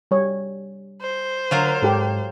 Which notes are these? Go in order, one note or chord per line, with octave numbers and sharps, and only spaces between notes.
G3 C#5
C5
D3 F#3 F4 A#4
G#2 G4 A4